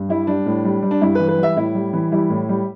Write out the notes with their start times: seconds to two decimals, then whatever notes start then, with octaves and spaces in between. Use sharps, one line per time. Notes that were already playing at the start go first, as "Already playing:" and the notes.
Already playing: G2
0.09 G3 E4
0.27 G3 D4
0.46 A2
0.65 G3
0.83 G3
0.91 D4
1.01 G2 E4
1.15 B4
1.20 E3
1.29 B4
1.38 G3
1.43 E5
1.56 A2 E4
1.75 G3
1.93 E3
2.12 G3 E4
2.30 A2
2.49 G3